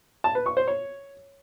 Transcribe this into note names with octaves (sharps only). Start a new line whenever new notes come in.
A5
B4
C#6
C5
C#5